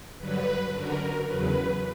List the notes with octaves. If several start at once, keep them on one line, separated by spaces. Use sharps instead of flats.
G2 D3 F#3 B4
F#2 D3 F#3 A#4
E2 C#3 F#3 B4